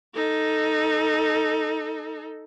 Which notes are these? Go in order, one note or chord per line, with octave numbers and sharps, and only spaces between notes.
D#4 A4